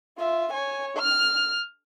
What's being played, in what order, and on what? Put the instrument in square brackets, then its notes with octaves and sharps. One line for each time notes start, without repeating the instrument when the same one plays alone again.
[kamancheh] F4 E5
C#5 G#5
F6